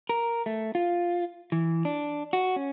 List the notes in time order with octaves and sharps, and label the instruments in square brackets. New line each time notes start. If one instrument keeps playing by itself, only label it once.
[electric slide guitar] A#4
A3
F4
E3
D4
F#4
C#4